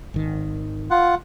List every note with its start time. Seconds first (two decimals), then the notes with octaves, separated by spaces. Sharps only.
0.14 G#1 D#3
0.91 F4 F#5